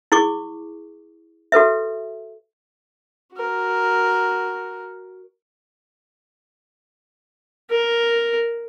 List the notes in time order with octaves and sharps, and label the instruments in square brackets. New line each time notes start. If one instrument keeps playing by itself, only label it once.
[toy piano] E4 G#4 C#6 D6
F#4 A4 B4 E5
[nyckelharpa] F#4 A#4
A#4